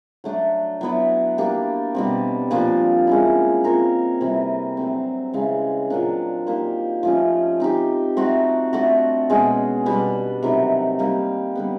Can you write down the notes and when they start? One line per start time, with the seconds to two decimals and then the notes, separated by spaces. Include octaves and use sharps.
0.24 F#3 A3 D4
0.81 F#3 B3 E4
1.38 A#3 D4 G4
1.95 B2 G3 C4
2.51 A#2 F3 A#3 D4
3.07 G#3 C#4 E4
3.64 C4 F4 A#4 C#5
4.21 C3 E3 G3 C4
4.77 F#3 A3 C4
5.33 C#3 E3 G#3 C4
5.90 A#2 F#3 A#3 D4
6.47 A#3 D#4 G4 C5
7.03 F3 A3 C#4
7.60 C4 D#4 G4
8.17 A3 C4 D#4 F#4
8.73 A3 D4 F#4
9.30 B2 G#3 C#4
9.86 B2 G3 B3 D4
10.43 C3 D#3 F#3 A3
10.99 G3 A#3 D#4 G4
11.55 D3 G3 B3